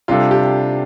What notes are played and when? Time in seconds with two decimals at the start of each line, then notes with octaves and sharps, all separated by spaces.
0.08 C3 G3 D4 F4 A4
0.31 G4